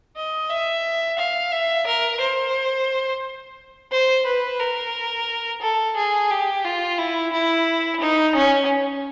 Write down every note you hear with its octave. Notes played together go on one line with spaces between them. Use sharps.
D#5
E5
F5
E5
A#4
C5
C5
B4
A#4
A4
G#4
G4
F4
E4
E4
D#4
C#4